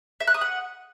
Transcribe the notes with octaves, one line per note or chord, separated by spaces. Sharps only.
E5
F#6
D#6
F#5